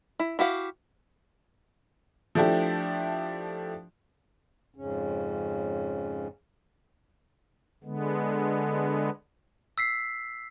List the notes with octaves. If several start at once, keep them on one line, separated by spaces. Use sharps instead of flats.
E4
E4 F#4 G4 F5
F3 A3 D4 E4 G4
F2 G#2 C#3 C#4
D3 G#3 B3
E6 B6 C7